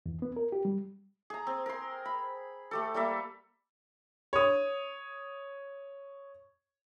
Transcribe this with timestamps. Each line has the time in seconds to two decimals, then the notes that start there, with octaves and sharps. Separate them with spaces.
0.06 E2
0.22 B3
0.36 A#4
0.52 G4
0.65 G3
1.30 G#4 A#5
1.47 C4
1.66 A#4 C6
2.05 B5
2.71 A3 G4 A4
2.94 G3 A#3 A4 E5
4.33 C#5 D#6